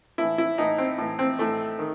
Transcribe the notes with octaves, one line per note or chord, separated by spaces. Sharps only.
A2 E3 E4
E4
A2 E3 D#4
C4
A2 E3
C4
A2 E3 A3
D#3